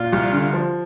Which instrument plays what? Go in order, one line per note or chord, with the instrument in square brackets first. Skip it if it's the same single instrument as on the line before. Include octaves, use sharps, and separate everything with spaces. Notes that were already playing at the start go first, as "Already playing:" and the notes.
Already playing: [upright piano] A#2 [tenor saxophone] F4
[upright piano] C2
D3
F3